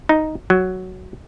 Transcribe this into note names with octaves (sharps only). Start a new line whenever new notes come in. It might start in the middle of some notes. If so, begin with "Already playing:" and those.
D#4
F#3